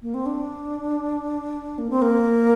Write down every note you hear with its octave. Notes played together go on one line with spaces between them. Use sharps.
A#3
C4
D4
A#3
C4
A#3